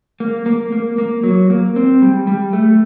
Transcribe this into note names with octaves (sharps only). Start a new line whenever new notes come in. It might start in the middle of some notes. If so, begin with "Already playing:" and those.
A#3
A#3
A#3
A#3
F#3
A#3
C4
G3
G3
A3